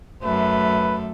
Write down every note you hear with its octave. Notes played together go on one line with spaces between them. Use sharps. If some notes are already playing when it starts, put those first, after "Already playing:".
F#2 A3 B4